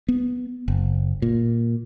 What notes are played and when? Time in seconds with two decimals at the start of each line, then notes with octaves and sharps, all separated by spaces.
0.08 B3
0.68 F#1
1.22 A#2